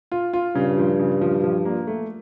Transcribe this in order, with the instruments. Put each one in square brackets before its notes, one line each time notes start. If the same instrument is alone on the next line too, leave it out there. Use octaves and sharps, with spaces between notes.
[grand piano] F4
F4
[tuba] G2 [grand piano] C#3
[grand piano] F3
C#3
F3
F3
A#3
A3